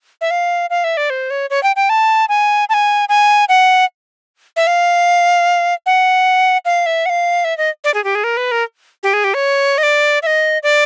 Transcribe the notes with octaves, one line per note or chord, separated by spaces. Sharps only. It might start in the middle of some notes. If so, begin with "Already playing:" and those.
E5
F5
F5
E5
D5
C5
C#5
C#5
G5
G5
A5
G#5
A5
G#5
G#5
F#5
E5
F5
F#5
F5
E5
F#5
F5
E5
D#5
D5
G#4
G4
G#4
A#4
B4
A#4
G4
G#4
G4
C#5
D#5
D5
E5
D#5
D5